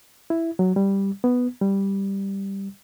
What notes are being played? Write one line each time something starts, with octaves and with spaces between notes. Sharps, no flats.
E4
F#3
G3
B3
G3